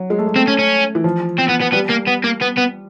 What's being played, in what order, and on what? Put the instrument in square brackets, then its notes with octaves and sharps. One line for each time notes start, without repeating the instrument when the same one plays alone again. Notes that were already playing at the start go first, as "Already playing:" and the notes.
Already playing: [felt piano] F#3
G#3
A3
G#3
[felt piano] A3 [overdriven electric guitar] C4
[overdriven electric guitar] C#4
C#4
[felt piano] E3
F3
[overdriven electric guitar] C4
B3
B3
[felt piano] G3 [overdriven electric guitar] B3
[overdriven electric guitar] A#3
B3
A#3
B3
B3